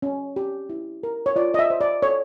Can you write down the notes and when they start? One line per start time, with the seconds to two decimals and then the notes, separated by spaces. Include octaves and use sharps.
0.02 C#4
0.36 G4
0.69 E4
1.03 A#4
1.26 C#5
1.36 F4 D5
1.54 D#5
1.59 E5
1.70 C5
1.81 D5
2.03 A4 C#5